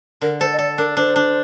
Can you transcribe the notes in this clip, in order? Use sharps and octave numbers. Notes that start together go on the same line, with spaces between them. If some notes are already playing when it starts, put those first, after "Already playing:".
D3 A#4
A4 C5
D#5
A4 D5
D4 A#4
D4 C5
D4